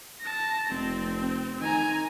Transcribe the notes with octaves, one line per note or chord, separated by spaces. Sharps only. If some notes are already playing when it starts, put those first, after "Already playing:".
A5 A#6
F1 C4
D#3 G#5 A#5